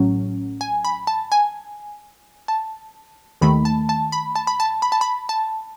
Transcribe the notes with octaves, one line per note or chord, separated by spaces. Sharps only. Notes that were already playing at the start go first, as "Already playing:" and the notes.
Already playing: A1 A2 F#3 C#4
G#5
B5
A5
G#5
A5
D#2 D#3 A3 B5
A5
A5
B5
A5
B5
A5
B5
A5
B5
A5